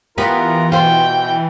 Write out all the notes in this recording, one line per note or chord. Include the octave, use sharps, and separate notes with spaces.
E3 B3 F4 G4 A#4 B4 A#5
B2 F4 C5 G5